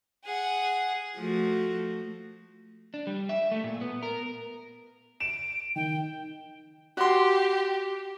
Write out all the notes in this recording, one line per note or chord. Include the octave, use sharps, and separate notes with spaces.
G#4 F#5
F3 A3 F#4
D4
G3
E5
A3
A#2
B3
A#4
D7 E7
D#3 G5
F#4 G4 C6